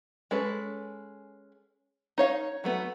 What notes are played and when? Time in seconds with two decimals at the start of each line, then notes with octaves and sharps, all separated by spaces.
0.31 G#3 C#4 A4 B4
2.18 D#4 C#5 F5
2.64 F#3 A3 B3